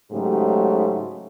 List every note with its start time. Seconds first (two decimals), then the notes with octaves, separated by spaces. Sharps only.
0.11 G#2 C#3 F#3 A3 G4